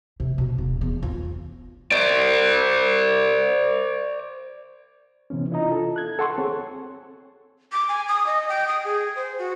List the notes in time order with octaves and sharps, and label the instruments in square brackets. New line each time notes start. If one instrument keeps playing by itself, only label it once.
[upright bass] C3
B2
E1
E2
F4
[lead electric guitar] C5 D5
[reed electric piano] C3 E3 B3 C#4
D4 E4 F4 D#5 A#5
F4 A4
F#6 G#6
A4 F#5 C6 C#6
C4 G#4 C5 C#5
[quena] D6
G#5
D#6
D#5
G5
D#6
G#4
C5
F#4